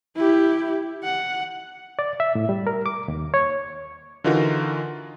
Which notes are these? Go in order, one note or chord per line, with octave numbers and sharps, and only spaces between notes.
E4 G4
F#5
D5
E5
A2
G3
A#4
D6
D#2
C#5
D3 E3 D#4 F4 F#4 A#4